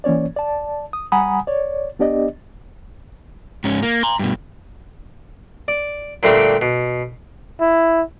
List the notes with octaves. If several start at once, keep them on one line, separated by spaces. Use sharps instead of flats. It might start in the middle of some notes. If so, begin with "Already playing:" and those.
E3 A#3 C#4 C#5 D5
D5 A5
D#6
G3 F#5 G#5 A#5 B5 D#6
C#5 D5
B3 D4 G4 D5 D#5
G#2 C#4
A#3
A#5 C6
G2 B2
D5
A#2 D3 G3 A3 C4 G4
B2
E4